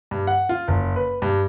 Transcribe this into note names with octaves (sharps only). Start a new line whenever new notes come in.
G2
F#5
F4
F#1
B4
G2